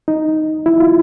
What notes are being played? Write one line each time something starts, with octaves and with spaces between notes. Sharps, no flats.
D#4
E4
F4